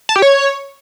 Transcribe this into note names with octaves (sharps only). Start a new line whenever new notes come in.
A5
G4
C#5